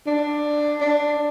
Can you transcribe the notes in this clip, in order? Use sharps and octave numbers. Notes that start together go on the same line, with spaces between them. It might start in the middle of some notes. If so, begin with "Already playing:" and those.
D4
D4